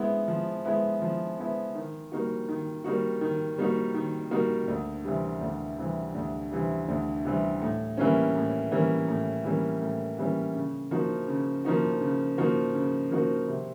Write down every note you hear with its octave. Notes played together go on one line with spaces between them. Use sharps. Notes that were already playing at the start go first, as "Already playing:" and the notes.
Already playing: G#3 B3 E4
F3
G#3 B3 E4
F3
G#3 B3 E4
D#3
G3 A#3 D#4 F#4
D#3
G3 A#3 D#4 F#4
D#3
G3 A#3 D#4 F#4
D#3
G3 A#3 D#4 F#4
D2
C3 E3 G3
D2
C3 E3 G3
D2
C3 E3 G3
D2
C3 E3 G3
A2
E3 G3 A#3 C#4
A2
E3 G3 A#3 C#4
A2
E3 G3 A#3 C#4
A2
E3 G3 A#3 C#4
C#3
F3 A#3 D#4 F#4
C#3
F3 A#3 D#4 F#4
C#3
F3 A#3 D#4 F#4
C#3
F3 A#3 D#4 F#4
C3